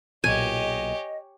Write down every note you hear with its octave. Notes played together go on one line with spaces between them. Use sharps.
B1 A#2 G4 C#5 D#5 G#5 D#7